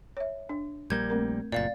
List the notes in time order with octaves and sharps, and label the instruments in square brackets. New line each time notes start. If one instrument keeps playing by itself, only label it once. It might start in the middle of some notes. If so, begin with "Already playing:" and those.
[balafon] C#5 E5
D4
[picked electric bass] A#1 G3 A#3 [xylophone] G6 G#6
[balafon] A3 C4 A#4
[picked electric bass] F#1 A#2 [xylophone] D5 F5 A6